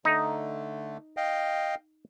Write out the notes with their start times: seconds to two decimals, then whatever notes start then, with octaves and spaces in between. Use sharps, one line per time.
0.05 D3 A3 D#4
1.17 D#5 F5 G5